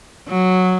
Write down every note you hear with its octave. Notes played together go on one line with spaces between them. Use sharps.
F#3